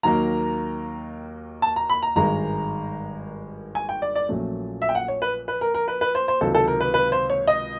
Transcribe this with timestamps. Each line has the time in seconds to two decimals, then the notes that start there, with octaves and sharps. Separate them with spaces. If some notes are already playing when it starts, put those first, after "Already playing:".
0.03 D#2 D#3 F#3 A#3 A#5
1.62 A5
1.76 A#5
1.90 B5
2.03 A#5
2.16 G#1 G2 D#3 G#3 A#5
3.75 G#5
3.89 G5
4.02 D5
4.15 D5
4.29 A#1 A#2 F#3 A3 C#4
4.82 E5
4.89 G5
4.95 F#5
5.08 C#5
5.22 B4
5.48 B4
5.61 A#4
5.74 A#4
5.88 B4
6.01 B4
6.15 C5
6.28 C5
6.41 C#2 C3 D#3 F#3 A4
6.55 A4
6.68 A#4
6.80 B4
6.94 B4
7.12 C5
7.30 C#5
7.47 D#5